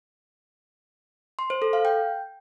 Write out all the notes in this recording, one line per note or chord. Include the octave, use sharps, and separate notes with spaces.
C6
C5
A4
F5
G5